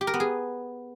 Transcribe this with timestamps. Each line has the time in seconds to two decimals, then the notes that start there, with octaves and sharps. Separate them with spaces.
0.01 G4
0.07 A#4
0.14 B3
0.20 G#4